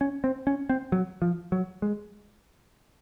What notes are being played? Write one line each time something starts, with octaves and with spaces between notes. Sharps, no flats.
C#4
C4
C#4
C4
F#3
F3
F#3
G#3